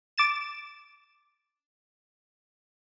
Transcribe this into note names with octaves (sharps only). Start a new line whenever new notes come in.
D6 A6 E7